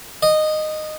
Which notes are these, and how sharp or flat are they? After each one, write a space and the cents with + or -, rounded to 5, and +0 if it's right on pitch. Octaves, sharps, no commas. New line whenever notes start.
D#5 -15